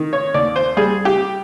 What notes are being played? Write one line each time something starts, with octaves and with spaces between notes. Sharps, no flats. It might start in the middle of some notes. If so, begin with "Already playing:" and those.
Already playing: D#3
C#5
D#2 D5
C5
G3 G#4
G4